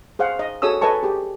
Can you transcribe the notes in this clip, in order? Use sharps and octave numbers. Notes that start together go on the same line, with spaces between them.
G#4 C5 F5 F#5
D#5
F#4 G#4 A4 C#5 D#6 E6
A4 B4 D#5 G#5 A5 C#6
G4 G#4